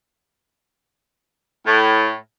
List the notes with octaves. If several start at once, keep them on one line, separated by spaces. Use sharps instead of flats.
A2